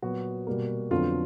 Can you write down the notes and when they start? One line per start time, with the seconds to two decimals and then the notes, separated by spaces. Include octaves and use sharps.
0.02 A#2 F#3 B3 F#4
0.47 B2 G3 A#3
0.90 F2 D3 F#3 B3 F4